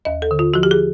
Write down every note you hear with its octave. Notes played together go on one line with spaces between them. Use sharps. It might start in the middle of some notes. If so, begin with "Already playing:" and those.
D#2 D#5
A4
D3
F4
F3 F#4
G4
G#4